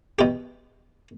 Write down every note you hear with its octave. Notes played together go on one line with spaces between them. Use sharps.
B2 G4